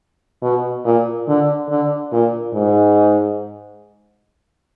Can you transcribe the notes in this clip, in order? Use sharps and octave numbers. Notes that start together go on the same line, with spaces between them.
B2
A#2
D3
D3
A#2
G#2